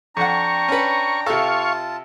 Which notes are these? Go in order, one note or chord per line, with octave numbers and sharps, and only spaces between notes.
F2 D4 F#5 G5 A#5 C#6
C#4 B4
C3 F4 A4 F5 A5 C#6